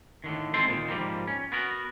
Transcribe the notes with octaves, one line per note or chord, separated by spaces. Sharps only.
A2 D3 D#3
G#3 C4 E4 A4 C5 C6
A#2 D#3
G#2 F3 G3 A#3
C#4
B3 F#4 A#4